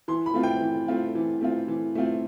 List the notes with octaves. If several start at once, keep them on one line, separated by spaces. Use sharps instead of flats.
E3 C6
B5
A3 C4 F4
G5
E3
A3 C4 F4
E3
A3 C4 F4
E3
A3 C4 F4